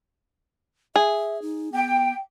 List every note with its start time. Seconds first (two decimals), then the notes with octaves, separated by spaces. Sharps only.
0.96 G#4 E5
1.42 D#4
1.72 B3 G5